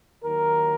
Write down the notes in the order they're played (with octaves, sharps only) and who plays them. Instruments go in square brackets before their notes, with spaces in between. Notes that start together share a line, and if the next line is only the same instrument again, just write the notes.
[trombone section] D#2 D#3 F#3 A#4